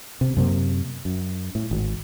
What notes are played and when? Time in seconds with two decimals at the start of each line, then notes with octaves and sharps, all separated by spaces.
0.21 C3
0.37 F#2 C3 A#3
1.05 F#2
1.55 A2
1.71 G#1